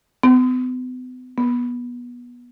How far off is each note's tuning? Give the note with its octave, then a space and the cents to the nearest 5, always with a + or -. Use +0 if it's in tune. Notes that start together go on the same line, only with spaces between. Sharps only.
B3 +40
B3 -20